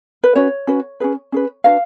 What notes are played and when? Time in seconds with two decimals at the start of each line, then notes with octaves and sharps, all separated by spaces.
0.24 B4
0.35 C#4 F#4 B4 C#5
0.67 C#4 F#4 B4
1.00 C#4 G#4 B4
1.32 C#4 G#4 B4
1.64 D4 F#4 B4 F5